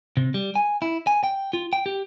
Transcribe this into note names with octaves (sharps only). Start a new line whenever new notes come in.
C3
G3
G#5
E4
G#5
G5
F4
G5
G4